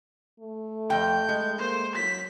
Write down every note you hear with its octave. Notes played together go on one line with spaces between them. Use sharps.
A3
F2 G5 G6
G#3
A#3 C5
F#3 B6